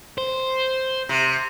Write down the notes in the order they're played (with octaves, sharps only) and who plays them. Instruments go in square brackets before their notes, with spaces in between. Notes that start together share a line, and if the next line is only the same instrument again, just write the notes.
[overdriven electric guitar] C5
[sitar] C3